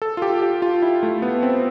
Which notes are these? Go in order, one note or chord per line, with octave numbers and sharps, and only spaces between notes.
A4
F4
G4
G4
F4
E4
A3
B3
C4